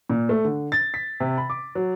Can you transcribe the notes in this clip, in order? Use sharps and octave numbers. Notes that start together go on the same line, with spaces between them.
A#2
A3
D3
A6
B6
C3
B5
D6
F#3